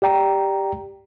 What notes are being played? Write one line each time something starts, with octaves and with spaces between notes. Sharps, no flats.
G4 D5 G5 A#5